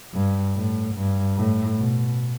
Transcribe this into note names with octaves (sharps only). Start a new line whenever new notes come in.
G2
A2
G2
A2
B2